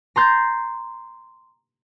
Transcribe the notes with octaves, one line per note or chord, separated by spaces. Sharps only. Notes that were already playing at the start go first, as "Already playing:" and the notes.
A#5 C6 G6 A6